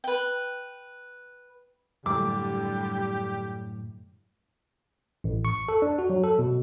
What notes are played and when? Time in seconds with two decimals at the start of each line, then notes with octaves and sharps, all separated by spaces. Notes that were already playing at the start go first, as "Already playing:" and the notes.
0.04 B4 G5
2.06 F#2 A2 D3 G3 G4 D6
5.24 A1
5.45 C#6
5.69 A4
5.82 D4
5.99 F#4
6.10 F#3
6.24 A4
6.39 B2